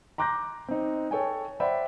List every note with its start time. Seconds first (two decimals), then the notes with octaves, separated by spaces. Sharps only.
0.18 A#5 C6 D6 F#6 G6 A#6
0.69 C4 D#4
1.11 A4 C#5 G5 G#5
1.60 C5 D5 E5 F#5 G5 B5